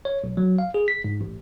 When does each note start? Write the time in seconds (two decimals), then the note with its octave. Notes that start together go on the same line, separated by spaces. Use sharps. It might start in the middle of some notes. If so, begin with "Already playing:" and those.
0.05 C#5
0.24 B1
0.37 F#3
0.58 F5
0.74 G#4
0.88 B6
1.04 G#2
1.21 A1